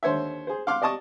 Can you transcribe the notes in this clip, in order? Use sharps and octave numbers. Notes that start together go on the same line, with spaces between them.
D#2 D3 C5 C#5 E5
G#4 C5
F5 F#5 C6 D6 F6
D5 D#5 A5 C#6 D#6